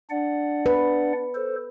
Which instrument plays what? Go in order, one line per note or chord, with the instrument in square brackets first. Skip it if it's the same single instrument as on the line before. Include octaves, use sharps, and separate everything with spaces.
[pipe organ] D4 D5 F#5
[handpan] B4
[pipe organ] A4 C5